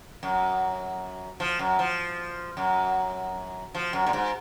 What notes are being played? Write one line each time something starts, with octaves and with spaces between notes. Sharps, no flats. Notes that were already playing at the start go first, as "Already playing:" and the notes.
F#2
F3
F#2
F3
F#2
F3
F#2
A#2
G#2